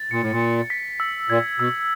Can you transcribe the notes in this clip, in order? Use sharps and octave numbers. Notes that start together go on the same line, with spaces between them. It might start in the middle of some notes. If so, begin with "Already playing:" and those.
Already playing: A6
A#2 C#7
A2
A#2
A6
B6
E6
A#2 G#6
B2 E6